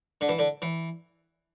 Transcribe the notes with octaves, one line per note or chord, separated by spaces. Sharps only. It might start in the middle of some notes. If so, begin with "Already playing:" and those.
D3
E3
D3
E3